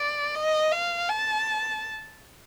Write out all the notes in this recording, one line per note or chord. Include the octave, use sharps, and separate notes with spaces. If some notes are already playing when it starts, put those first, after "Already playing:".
Already playing: D5
D#5
F5
A5